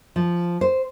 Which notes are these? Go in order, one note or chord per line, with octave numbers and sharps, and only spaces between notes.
F3
C5